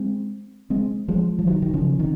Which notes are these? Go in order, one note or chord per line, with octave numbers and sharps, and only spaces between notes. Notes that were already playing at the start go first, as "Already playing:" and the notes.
Already playing: G#3 C4
G#3 C4
F3 G#3
F3
D#3 F#3
D#3
C#3 F3
C3 D#3